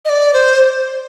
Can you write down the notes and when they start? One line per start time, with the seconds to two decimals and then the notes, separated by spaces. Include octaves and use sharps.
0.05 D#5
0.09 D5
0.34 C5